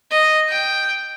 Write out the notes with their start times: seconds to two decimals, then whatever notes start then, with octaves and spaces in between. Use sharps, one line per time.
0.11 D#5
0.49 G5